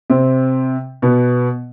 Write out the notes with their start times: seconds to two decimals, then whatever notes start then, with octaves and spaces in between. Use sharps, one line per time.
0.10 C3 C4
1.02 B2 B3